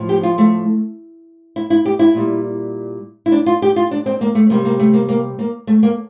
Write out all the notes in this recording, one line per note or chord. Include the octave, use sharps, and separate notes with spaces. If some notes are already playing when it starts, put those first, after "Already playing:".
Already playing: A2 F3
G4
F4
A3
E4
E4
G4
E4
A#2 G3
E4
D4
F4
G4
F4
D4
C4
A#3
A3
C3 G3 A#3
A#3
A3
A#3
A#3
A#3
A3
A#3